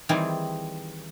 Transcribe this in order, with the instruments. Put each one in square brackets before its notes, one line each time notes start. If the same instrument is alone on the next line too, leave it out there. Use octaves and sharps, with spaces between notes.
[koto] D#3 E3 G3 C4 G#4